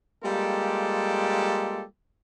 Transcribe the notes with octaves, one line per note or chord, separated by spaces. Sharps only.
G3 G#3 A#3 F4 G4 A4